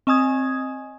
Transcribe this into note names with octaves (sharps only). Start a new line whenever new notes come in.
C4 D#5 G#5 D#6 G#6